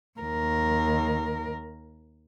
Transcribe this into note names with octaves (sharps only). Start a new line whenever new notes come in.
D#2 A#4